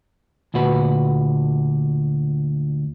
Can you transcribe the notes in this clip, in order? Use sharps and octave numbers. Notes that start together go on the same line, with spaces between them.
D2 A#2 F#4 B4